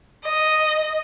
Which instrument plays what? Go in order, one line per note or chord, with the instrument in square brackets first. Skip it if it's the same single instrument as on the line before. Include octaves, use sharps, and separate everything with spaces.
[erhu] D#5